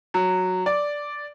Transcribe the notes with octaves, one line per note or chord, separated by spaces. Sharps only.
F#3
D5